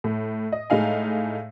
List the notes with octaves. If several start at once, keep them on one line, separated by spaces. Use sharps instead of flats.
A2
D#5
A2 G#3 D#4 F5 G#5